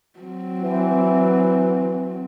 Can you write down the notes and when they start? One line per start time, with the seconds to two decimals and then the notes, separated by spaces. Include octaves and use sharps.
0.20 F#3 C4
0.62 E3